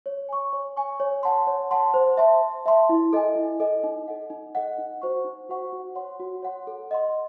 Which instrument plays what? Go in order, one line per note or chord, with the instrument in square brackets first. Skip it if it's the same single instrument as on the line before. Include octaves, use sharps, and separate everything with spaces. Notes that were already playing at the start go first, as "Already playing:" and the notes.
[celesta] C#5
G#5 C#6
C#5
G#5 C#6
C#5
F#5 A5 C6
C#5
F#5 A5 C6
C5
E5 A5 C6
C5
E5 A5 C6
E4
A4 D#5 G#5
E4
A4 D#5 G#5
D#4
A4 D#5 F#5
D#4
A4 D#5 F#5
D#4
F#4 C5 F#5 C#6
D#4
F#4 C5 F#5 C#6
F#4
C#5 F#5 C6
F#4
C#5 F#5 C6
A4
D#5 F#5 C6